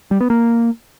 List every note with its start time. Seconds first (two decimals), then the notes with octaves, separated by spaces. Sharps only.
0.11 G3
0.21 B3
0.30 A#3